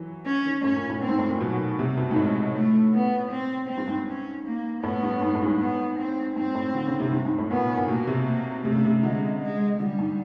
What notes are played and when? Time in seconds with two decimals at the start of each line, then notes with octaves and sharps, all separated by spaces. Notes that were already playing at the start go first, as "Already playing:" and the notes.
Already playing: E3 F#3
0.26 C#4
0.45 D#3
0.64 A2 C#4
0.76 A#2
0.90 A2
1.02 C4
1.09 G#2
1.19 A2
1.29 A#2
1.41 B2 F#3
1.79 C3 G3
1.97 B2
2.11 G#2
2.16 A2 G#3
2.55 A3
2.93 B3
3.31 C4
3.68 C4
3.77 G2
3.88 G#2
4.07 C#4
4.45 A#3
4.83 A2 B3
5.03 G2
5.22 G#2
5.35 A2
5.43 G2
5.46 G#2
5.60 B3
5.98 C4
6.36 G#2 C4
6.55 A2
6.74 D3
6.87 C#3
7.00 C3
7.12 G2
7.25 G#2
7.38 A2
7.50 A#2 B3
7.77 A#2
7.88 B2 A#3
8.07 C3
8.27 A#3
8.64 C3 A3
8.75 C#3
8.85 C3
9.03 D3 G#3
9.41 G#3
9.80 D3 G3
9.99 G#2